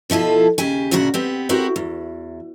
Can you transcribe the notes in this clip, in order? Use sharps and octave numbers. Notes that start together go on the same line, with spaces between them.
B2 F3 E4 F4 A4
D#2 C#3 G4 G#5
D2 A#2 C#3 F#4 A#4 F#5
B3 C4 G4
C4 E4 F#4 G4 A#4
E2